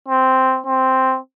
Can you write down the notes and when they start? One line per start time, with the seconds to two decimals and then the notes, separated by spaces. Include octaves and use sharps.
0.08 C4
0.66 C4